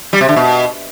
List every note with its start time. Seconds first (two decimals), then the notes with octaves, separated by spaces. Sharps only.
0.13 G3
0.21 C3
0.29 D3
0.36 B2